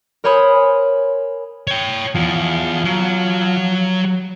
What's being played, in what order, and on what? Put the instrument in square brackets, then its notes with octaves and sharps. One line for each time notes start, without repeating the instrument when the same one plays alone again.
[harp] A#4 C5 C#5 G#5 B5 D#6
[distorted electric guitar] C#5 G5
[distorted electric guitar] E2 [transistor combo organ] F3
[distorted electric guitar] F#3